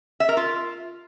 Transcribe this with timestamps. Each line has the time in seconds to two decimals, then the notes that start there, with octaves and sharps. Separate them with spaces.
0.20 E5
0.29 A#4
0.37 F4